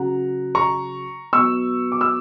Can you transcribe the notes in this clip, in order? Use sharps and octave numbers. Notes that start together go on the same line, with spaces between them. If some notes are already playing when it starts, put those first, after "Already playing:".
Already playing: C#3 F#3 F#5 A#5
A#5 C#6
B2 F#3 C#6 E6
D6
E6